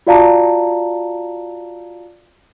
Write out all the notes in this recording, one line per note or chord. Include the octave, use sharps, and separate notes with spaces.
F4 F#4 D5 F5 A5 A#5